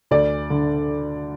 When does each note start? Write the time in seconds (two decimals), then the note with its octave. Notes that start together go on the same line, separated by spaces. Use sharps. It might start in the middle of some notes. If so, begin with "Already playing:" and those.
0.11 D2 D5
0.50 D3